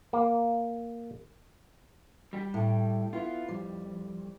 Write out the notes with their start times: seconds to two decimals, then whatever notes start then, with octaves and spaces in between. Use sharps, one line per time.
0.13 A#3
2.33 G3 G4
2.54 A2
3.13 B3 E4 F4
3.48 F2 G3